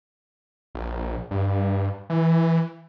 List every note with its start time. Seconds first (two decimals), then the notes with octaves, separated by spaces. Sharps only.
0.75 A#1
1.31 G2
2.10 E3